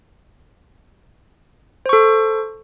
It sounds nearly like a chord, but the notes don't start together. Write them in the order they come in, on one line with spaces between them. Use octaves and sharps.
C5 C#6 A4